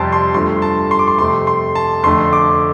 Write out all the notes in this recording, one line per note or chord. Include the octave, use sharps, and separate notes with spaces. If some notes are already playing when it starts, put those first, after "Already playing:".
Already playing: F2 C3 G3 A5 C6
C6
G2 F3 A3 C6
A5
C6
D6
C6
F2 C3 A3 C6
C6
A5
F2 D3 A3 C6
D6